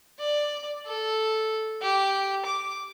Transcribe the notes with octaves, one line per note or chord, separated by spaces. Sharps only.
D5
A4
G4
D6